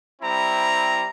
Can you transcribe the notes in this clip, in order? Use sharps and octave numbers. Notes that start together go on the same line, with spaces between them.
G3 C4 E4 A#5